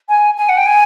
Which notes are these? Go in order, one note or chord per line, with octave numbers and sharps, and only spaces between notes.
G#5
G#5
F#5
G5
G#5